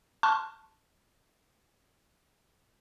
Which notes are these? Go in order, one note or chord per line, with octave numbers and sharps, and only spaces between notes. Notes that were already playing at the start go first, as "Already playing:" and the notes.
A5 C6 C#6 F6 F#6